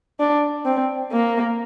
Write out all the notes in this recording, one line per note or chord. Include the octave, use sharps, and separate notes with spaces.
D4
C4
A#3